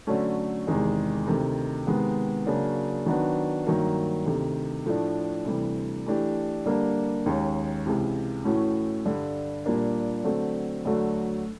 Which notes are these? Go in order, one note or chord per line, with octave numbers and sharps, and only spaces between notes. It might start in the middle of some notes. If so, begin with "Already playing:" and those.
D3 F#3 A3 C#4
E2 C3 D#3 G#3
D2 C3 D#3
C3 D#3 G#3 B3
C#3 F#3 A#3 D4 F#4
D#3 F#3 B3 D4 F#4
G2 D#3 F#3 A#3
D2 C3 D#3
A2 F3 A3 D4
D2 C3 E3 G3
E3 A3 D4 G4
D3 G3 A#3 D4
D#2 D#3 G#3 C#4
C#2 C3 E3
A2 E3 A3 C#4 F#4
G2 D3 G3
A#2 G3 A#3 D4
D3 F#3 A3 C4
D2 D3 F#3 A3